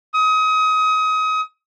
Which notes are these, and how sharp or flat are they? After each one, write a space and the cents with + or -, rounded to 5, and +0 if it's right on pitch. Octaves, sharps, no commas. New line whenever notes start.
D#6 +30